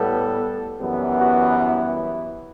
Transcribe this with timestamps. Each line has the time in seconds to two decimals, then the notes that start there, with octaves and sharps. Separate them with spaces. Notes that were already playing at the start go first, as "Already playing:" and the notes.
Already playing: A2 G3 B3 A4
0.80 F#2 E3 G3 B3
1.18 F#4
1.56 E4